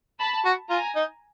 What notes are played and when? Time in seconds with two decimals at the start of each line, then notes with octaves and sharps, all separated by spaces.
0.19 A5 B5
0.45 F#4
0.70 F4 G#5 A#5
0.96 D#4